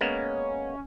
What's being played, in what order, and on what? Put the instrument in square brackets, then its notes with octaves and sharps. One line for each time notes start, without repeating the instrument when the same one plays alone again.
[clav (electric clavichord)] G#3 A#3 B3 [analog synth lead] C#4